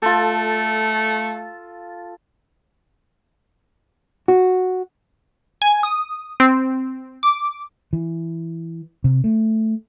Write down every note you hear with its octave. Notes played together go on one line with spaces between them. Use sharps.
A3 F4 A4
F#4
G#5
D#6
C4
D6
E3
C3
A3